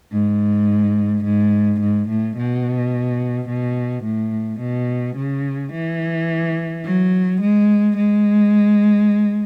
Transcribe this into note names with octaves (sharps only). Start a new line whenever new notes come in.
G#2
G#2
G#2
A2
B2
B2
A2
B2
C#3
E3
F#3
G#3
G#3